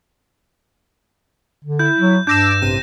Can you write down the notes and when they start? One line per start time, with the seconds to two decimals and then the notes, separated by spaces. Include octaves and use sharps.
1.65 D3
1.79 E4 G6
1.97 F#3
2.27 G2 D4 D6 E6 G6 A#6 E7
2.62 A1 C3 D#7